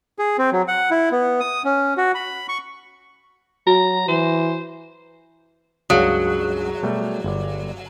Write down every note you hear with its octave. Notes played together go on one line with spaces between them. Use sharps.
G#4
C4
F#3
F#5
E4
B3
D#6
C#4
F#4
B5
C#6
F#3 F#4 A#5
E3 C5
C#2 G2 C#3 F#3 G#4 F5 D#6
B2 G3 A3
G1 D5